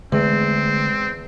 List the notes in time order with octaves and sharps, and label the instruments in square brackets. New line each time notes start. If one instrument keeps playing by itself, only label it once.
[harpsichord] E2 [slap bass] D3 A3 [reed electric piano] G#3 [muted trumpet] C4